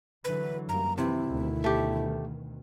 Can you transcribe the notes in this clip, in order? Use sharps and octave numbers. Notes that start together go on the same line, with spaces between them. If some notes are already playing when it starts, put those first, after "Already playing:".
D3 E3 F#3 B4
F#2 G3 A#3 A#5
C3 D#3 E3 E4
D2 B2 D#3
A3 G4